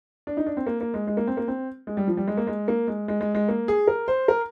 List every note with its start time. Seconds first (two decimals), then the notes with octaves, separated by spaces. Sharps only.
0.27 D4
0.37 D#4
0.46 D4
0.57 C4
0.67 A#3
0.81 A#3
0.94 G#3
1.07 G#3
1.17 A#3
1.27 C4
1.37 A#3
1.48 C4
1.87 G#3
1.97 G3
2.07 F3
2.17 G3
2.28 G#3
2.37 A#3
2.47 G#3
2.68 A#3
2.88 G#3
3.08 G#3
3.21 G#3
3.35 G#3
3.48 A#3
3.68 G#4
3.87 A#4
4.08 C5
4.28 A#4